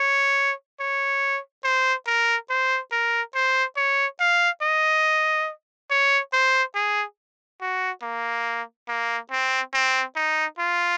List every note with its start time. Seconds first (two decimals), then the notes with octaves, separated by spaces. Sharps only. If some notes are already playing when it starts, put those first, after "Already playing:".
Already playing: C#5
0.80 C#5
1.64 C5
2.07 A#4
2.50 C5
2.92 A#4
3.34 C5
3.77 C#5
4.20 F5
4.62 D#5
5.91 C#5
6.33 C5
6.75 G#4
7.61 F#4
8.02 A#3
8.88 A#3
9.31 C4
9.74 C4
10.16 D#4
10.58 F4